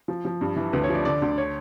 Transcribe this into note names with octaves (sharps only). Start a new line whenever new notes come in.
F3
F3
G2
E3
D2 B4
C#5
F3
D5
D3 D5
D2
C#5